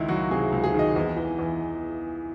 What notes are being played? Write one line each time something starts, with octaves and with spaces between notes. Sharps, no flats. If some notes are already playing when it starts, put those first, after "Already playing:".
Already playing: C#2 D#3 D#4 E4
F#3 F#4
C3 G#4
C#2
G#4
D#3 D#5
E2
E3
E2